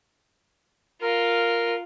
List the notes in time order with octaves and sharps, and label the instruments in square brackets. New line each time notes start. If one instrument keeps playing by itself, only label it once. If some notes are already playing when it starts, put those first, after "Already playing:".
[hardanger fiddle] F4 [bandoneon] A#4